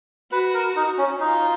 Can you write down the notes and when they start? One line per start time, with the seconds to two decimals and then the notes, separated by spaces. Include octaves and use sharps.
0.32 F#4 B4
0.54 A#4
0.76 D#4
0.98 C#4
1.20 D#4 F4